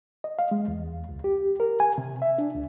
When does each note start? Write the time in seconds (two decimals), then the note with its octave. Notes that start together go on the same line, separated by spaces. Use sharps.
0.24 D#5
0.39 F5
0.51 G#3
0.68 E2
1.09 C#2
1.24 G4
1.60 A#4
1.80 G#5
1.98 C3
2.22 E5
2.38 D4
2.54 C#2